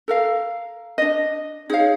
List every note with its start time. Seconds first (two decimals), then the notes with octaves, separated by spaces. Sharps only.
0.08 A4 A#4 F5
0.98 D4 D#5
1.70 D#4 G#4 C#5 F5